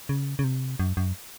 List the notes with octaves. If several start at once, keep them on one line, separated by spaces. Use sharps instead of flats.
C#3
C#3
C3
F#2
F#2